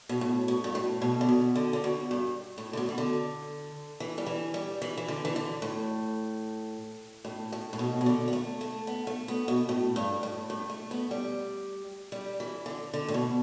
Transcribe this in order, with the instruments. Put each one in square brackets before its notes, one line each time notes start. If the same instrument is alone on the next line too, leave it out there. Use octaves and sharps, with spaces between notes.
[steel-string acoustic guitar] B2
A2
B2
G2
A2
B2
D3
B2
D3
D3
B2
G2
A2
D3
B2
E3
D3
E3
G3
E3
G3
E3
E3
D3
E3
D3
A2
A2
A2
A2
B2
B2
D3
B3
A3
A3
B3
A3
B3
B2
A2
G2
A2
G2
A3
B3
G3
G3
E3
D3
D3
A2
B2